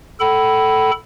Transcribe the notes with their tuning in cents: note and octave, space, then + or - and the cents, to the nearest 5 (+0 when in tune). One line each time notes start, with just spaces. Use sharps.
A4 +0 G5 -45 B5 +0